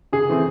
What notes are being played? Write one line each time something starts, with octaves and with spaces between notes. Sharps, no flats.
C#3 G#4
E3 A3 C4